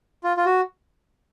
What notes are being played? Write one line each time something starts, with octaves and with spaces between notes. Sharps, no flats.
F4
F4
F#4